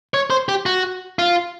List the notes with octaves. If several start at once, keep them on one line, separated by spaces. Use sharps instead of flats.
C#5
C5
G4
F#4
F4